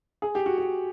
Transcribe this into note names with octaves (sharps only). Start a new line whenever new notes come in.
G#4
G4
F#4
G4